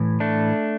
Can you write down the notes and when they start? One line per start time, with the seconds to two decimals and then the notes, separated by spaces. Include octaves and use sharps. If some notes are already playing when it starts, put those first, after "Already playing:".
Already playing: A2 E3
0.20 A3 D4